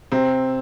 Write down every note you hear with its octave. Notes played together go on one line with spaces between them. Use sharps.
C3 C4